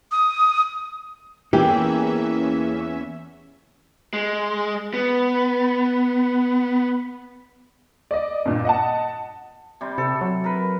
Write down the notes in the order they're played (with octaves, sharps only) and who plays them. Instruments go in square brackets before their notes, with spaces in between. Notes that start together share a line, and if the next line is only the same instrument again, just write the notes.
[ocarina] D#6
[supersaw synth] E2 C#4 E5 [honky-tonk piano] E3 [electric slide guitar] A#3 G#4 [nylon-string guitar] G4
[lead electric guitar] G#3
B3
[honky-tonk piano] D5 D#5
G2 A#2
D#5 F#5 A5
[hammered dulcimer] C3 G3
[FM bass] C3 [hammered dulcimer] A4
[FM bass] F#3
[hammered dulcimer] A#4 B4